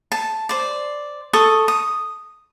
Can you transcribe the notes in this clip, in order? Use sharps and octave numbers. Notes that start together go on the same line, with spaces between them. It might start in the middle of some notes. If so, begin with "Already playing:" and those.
A5
C5 D5
A4 C#6 D#6
D#6